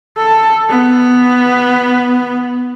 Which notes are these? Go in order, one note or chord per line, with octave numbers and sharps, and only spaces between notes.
A4
B3